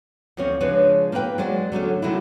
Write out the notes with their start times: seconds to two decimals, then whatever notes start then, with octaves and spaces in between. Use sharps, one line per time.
0.37 D2 F3 C4 C#4 C#5
0.60 C#3 F3 G#3 D4 B4 C#5
1.12 A#3 C4 D#4 B4 G5
1.38 F#3 G#3 C5 D5
1.72 D3 F#3 A3 C#4
2.02 C3 F#3 G#3 A3 E4